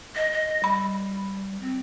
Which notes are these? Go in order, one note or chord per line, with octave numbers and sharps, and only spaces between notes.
D#5
D#5
G3 B5
C4